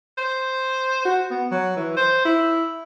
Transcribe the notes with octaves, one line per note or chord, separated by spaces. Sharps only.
C5
F#4
B3
F#3
E3
C5
E4